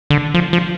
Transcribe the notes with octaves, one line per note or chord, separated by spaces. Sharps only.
D3
F3
F3